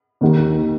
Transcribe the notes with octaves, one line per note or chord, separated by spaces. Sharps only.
D#2 D#3